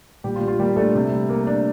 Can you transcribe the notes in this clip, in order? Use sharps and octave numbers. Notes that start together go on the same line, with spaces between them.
A#2 G3 G4
F4
G3
F4
G3 A#3 G4
A3 D4 A4
C3
G3
A#3
D4